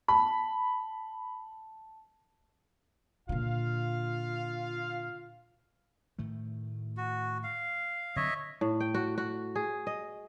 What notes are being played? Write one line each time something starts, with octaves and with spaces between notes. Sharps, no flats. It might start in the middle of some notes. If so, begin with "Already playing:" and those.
A5 B5
A#2 D3 F4 F5
A2 D#3 A3
F#4
F5
D3 F#3 C4 C#5 D#5 E5
A2
G5
F#4
F#4
G#4
D#5